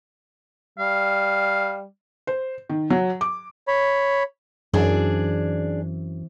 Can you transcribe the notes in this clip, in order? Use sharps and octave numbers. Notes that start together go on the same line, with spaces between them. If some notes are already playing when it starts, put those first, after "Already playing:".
G3 F5
C5
D#3
F#3
D6
C#5 B5
F#2 E3 C4 D4 E4 G#4 D5